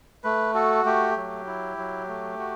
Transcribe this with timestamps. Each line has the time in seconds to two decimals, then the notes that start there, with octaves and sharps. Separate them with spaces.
0.24 A3 B4
0.54 F#4 A4
0.85 A3 G4
1.16 F#3
1.47 E4
1.78 F#3
2.08 A3
2.39 F#4